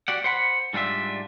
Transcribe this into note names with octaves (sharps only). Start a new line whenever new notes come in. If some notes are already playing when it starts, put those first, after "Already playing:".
F#4 G4 D5 F#5
C5 F#5 B5
G#2 G3 D4 F4 E5